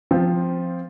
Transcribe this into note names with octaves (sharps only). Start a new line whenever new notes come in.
F3 C4 F4